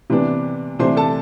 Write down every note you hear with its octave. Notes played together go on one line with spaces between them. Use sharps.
C3 E3 B3 D4
C3 E3 A3 D4 C5 C6
A4 A5